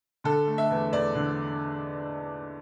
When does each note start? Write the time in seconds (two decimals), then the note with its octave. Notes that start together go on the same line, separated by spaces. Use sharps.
0.24 D3 A4
0.47 A3
0.58 E5
0.70 E2
0.92 E2 D5
1.15 D3